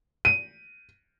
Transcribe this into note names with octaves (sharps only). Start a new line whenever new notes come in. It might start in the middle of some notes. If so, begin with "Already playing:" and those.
D#7